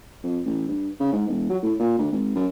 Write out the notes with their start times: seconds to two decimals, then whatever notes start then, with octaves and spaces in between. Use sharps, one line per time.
0.23 F2
0.45 A1
0.68 G2
1.00 C#3
1.13 G#2
1.28 E1
1.50 F#3
1.63 A2
1.79 A#2
1.98 D2
2.12 G#1
2.35 F#2